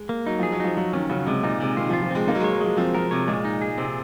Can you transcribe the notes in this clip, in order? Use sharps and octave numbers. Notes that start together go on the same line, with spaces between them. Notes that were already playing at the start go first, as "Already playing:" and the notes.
Already playing: G#3
A#3
F#3 D#4
F3
G#4
F#3
F3 D#4
F3 F#3
D#3 C#4
C#3 F#3
C3 G#3
A#2 D#4
C3 G#3
D#3 F4
F3
F4
F3
G#3 C4
A#3 D#4
F#3
G#3
C#5
F#3
F3 G#3
F3 C4
F3 A#4
C3 C#5
A#2 G#3
D#4
G#4
C3 C4